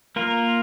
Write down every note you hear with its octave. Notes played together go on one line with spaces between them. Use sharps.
A#3 F4 A#4